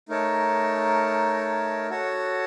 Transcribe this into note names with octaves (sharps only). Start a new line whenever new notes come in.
A3 D#4 A#4 C#5 A5
F#4 A4 C#5 F#5 A5